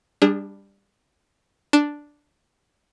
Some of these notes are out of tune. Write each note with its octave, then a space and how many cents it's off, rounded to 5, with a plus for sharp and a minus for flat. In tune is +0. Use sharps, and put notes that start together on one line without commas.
G3 +15 D4 +0 G#4 -25
D4 +0 A5 +0